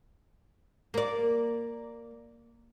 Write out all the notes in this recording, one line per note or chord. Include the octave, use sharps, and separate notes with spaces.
A#3 D5